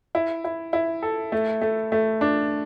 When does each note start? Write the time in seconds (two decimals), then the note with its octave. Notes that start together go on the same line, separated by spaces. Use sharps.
0.15 E4
0.45 E4
0.73 E4
1.02 A4
1.32 A3
1.62 A3
1.92 A3
2.21 D4